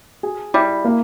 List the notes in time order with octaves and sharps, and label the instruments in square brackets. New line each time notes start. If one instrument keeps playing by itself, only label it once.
[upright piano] G#4
[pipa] G3 [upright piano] E4
[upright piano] A#3